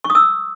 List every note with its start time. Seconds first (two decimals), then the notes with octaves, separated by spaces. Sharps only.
0.04 C#6
0.10 D#6
0.15 E6